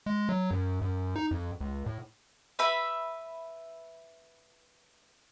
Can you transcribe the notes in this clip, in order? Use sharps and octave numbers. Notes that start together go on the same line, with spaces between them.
G#3
F#3
F#2
F#2
D#4
F2
C#2
A2
B4 E5 B5